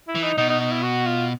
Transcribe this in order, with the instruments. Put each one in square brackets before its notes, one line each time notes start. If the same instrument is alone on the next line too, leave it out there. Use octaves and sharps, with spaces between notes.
[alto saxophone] E4
[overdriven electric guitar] E3
[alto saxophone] D#4
[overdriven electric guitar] B2 [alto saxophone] D#4
[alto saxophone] D#4
D#4
E4
F#4
F4